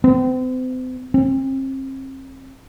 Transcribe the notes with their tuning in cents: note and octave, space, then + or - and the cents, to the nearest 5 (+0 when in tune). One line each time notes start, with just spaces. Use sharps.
C4 -40
C4 +40